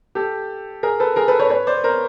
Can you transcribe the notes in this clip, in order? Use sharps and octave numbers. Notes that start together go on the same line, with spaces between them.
G4 A4
G#4 A#4
A4 B4
G#4 A#4
A4 B4
B4 C#5
B4 C#5
C5 D5
A#4 C5